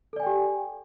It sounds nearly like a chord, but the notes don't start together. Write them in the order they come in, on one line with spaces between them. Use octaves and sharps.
A4 D5 G#5 G5 G4